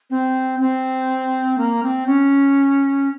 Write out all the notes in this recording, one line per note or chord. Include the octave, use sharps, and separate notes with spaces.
C4
C4
A#3
C4
C#4